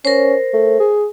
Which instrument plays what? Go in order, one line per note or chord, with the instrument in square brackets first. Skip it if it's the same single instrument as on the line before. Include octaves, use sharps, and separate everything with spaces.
[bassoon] C#4 [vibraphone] A#4 C5
[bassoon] A3
G#4